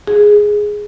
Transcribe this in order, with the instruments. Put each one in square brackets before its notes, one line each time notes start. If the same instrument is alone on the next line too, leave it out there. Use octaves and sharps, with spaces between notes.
[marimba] G#4